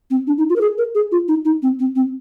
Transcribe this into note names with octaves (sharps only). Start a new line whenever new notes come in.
C4
D4
D#4
F4
A#4
G#4
A#4
G#4
F4
D#4
D#4
C4
C4
C4